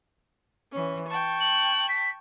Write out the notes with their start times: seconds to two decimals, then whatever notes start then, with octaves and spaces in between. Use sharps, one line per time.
0.70 E3 C#4
1.07 G5 A5 C#6
1.40 F#7
1.89 B6